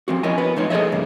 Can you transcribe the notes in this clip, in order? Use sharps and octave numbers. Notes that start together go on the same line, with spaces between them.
F3 C4 F#4
C#4 E4 A#4 C#5 D#5 G#5
B3 B4
F2 F3 A3 D#4 C#5
G#4 A4 B4 C#5 D#5 E5
G2 C#3 A#3